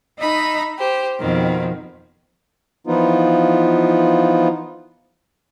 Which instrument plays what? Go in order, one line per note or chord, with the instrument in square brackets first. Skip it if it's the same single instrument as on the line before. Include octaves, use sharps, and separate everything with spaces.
[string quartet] D#4 D#5 E5 A#5 B5
G4 C5
F2 B2 D#3 C4
[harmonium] E3 F3 B3 D#4 F4